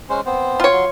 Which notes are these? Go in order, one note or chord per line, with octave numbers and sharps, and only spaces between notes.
G#3 C#4 C5
B3 C4 C5
F4 C#5
F#3 C6